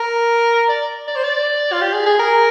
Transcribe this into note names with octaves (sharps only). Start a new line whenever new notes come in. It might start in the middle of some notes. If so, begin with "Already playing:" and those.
Already playing: A#4
D5
D5
C5
D5
F4
G4
G#4
G#4
A#4